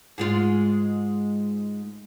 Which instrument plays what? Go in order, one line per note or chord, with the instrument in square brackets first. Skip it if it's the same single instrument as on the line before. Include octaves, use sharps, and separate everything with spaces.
[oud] G#2 G#3 F4